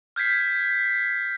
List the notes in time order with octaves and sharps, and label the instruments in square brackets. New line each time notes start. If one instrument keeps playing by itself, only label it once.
[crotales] F6 G6 G#6 B6 C7